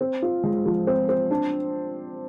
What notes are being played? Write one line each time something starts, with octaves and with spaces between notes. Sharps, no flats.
C4
F4
G#3
F3
C4
C4
D4